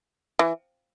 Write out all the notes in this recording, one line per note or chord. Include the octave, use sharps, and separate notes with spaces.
E3